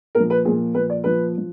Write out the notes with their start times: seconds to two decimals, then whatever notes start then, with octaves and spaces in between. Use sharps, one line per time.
0.15 A#2 F3 A#4
0.30 B4
0.45 A#2 F3 G#4
0.75 A#2 F3 B4
0.90 D5
1.04 A#2 F3 B4
1.37 F3